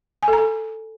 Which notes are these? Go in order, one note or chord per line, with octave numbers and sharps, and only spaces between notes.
G#5
A4
A#5
A4